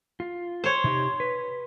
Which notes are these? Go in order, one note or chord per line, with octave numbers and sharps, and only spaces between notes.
F4
C5 C#5
C3 D#4 G4
B4